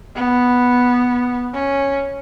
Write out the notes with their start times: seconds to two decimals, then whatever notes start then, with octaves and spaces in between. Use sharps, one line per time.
0.15 B3
1.53 C#4